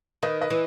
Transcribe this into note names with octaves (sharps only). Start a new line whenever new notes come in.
D#3 B4 D#5
B4 D#5
E3